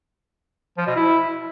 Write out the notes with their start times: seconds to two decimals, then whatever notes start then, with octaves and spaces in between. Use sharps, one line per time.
0.78 F3
0.87 B2
0.96 E4